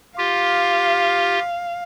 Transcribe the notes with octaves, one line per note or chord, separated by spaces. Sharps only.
F4 G4 F5